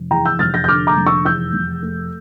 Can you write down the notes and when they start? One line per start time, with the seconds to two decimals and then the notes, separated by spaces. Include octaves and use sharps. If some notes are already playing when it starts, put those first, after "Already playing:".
Already playing: F1
0.11 E2 G5 A#5
0.25 E6 G6
0.39 F1 F6 A6
0.54 G6 A#6
0.64 G6
0.68 D3 D6 F6
0.87 A#5 D6
0.97 F1
1.06 C#6 E6
1.25 E2 E6 G6
1.53 F1
1.82 A3